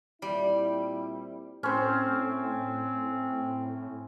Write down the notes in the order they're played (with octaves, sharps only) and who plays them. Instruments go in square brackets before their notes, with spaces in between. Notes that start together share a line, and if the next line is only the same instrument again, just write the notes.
[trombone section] A#2 C4 E4 [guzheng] G3
[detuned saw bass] A2 [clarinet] C4 [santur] C#4 C5